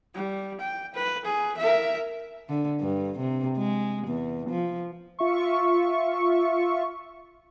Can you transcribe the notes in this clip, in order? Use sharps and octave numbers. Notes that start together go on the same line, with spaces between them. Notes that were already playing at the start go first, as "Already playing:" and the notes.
G3
G5
B4
G#4
A#4 E5
D3
G2
C3
G#3
E2
F3
F4 E5 C#6